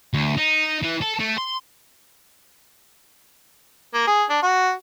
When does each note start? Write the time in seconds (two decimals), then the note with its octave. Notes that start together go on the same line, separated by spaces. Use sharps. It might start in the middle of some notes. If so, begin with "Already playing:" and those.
0.14 D2
0.37 D#4
0.83 E3
1.01 A4
1.19 A3
1.38 C6
3.94 A#3
4.07 G#4
4.30 D4
4.43 F#4